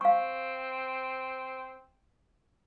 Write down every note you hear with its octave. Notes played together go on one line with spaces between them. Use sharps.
C4 F5 C#6